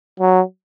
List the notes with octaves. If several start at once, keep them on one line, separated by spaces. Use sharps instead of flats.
F#3